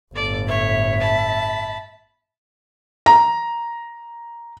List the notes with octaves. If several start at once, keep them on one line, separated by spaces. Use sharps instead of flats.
G1 A2 A4 D5
C#5 E5
A5 B5
A#5